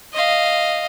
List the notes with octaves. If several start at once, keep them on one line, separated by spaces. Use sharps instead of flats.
D#5 F5